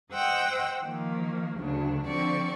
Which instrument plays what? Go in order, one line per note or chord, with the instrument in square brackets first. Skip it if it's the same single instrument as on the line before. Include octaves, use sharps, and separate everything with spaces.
[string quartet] C5 D#5 F#5 G5 E6
D#3 F3 A#3
D2 C#3 F#3 D4
D3 F3 C4 D5 C#6